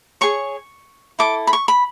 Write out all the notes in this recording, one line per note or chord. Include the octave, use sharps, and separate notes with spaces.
G#4 C#5 C#6
E4 A4 D6
B5
C#6
B5